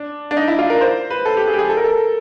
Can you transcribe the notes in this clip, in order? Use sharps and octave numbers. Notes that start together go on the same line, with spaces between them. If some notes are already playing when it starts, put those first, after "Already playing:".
Already playing: D4
D4
D#4
E4
F4
A#4
C5
B4
A4
G4
G#4
G4
G#4
A4
A#4
A4